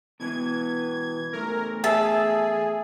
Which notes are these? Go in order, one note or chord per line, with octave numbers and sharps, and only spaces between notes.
B2 E3 B3 G#6
E2 A3 A#4
G#4 E5 A5